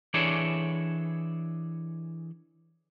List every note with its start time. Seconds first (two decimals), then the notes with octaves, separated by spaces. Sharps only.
0.14 E3 D4 G#4 A4 C#5 D5